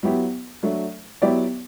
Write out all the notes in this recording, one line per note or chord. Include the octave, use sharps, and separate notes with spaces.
F#3 B3 E4 G4
F#3 A3 D4
F#3 B3 E4 G4 D5